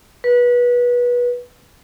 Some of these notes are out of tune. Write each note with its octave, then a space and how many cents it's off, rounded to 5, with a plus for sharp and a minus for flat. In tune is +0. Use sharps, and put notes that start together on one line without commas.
B4 -25